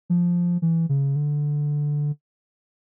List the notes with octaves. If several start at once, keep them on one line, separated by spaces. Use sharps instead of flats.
F3
E3
C#3
D3